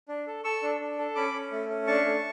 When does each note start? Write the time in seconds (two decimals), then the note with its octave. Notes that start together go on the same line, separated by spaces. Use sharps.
0.08 D4
0.27 A4
0.44 A4 C#6 E6
0.63 D4
0.81 D4
0.98 A4
1.15 C#4 B5 D6
1.34 C#4
1.52 A3
1.70 C#4
1.87 D4 A5 C#6
2.06 A3